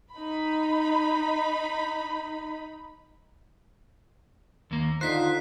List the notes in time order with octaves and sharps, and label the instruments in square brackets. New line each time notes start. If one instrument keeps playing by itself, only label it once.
[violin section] D#4 B5
[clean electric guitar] D#2 A#3
[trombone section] D3 D#4 F4 [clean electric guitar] C5 [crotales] F#6 B6 C7